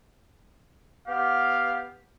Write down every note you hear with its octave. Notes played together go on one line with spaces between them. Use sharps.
B3 G4 F5